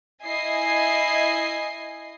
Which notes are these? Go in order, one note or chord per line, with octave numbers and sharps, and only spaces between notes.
E4 D#5 G#5 C7